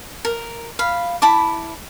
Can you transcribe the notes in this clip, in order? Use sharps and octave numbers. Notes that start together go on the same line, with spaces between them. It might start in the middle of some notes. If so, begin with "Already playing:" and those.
A#4
F5 B5
E4 A5 B5 D6